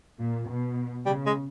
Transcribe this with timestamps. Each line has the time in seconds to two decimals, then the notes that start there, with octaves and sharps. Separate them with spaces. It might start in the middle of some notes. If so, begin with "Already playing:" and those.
0.19 A#2
0.48 B2
1.06 C#3 G3
1.26 G#3